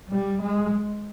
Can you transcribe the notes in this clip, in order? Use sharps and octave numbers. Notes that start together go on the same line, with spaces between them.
G3
G#3